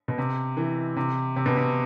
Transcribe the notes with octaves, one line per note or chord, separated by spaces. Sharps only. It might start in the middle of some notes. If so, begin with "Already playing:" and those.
B2
C3
E3
C3
C3
B2
C3